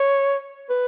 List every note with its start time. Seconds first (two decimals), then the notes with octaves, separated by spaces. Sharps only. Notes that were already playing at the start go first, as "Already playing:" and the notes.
Already playing: C#5
0.70 B4